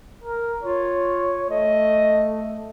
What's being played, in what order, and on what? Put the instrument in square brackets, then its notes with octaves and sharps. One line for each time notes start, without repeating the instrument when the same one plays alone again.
[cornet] A#4
[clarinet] F4 [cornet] C#5
[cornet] A3 [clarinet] D#5